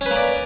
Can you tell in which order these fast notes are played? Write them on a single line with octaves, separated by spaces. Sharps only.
C#4 B4 A#3 D5